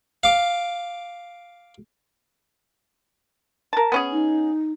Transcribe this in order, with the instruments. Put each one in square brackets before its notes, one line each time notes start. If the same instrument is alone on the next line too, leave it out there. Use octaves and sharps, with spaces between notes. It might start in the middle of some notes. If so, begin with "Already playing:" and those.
[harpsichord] F5 D6
[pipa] A#4 A5
B3 C#4 G#4
[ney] D#4